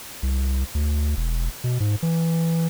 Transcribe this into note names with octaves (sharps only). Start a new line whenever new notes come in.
C2
D2
E1
B2
G#2
E3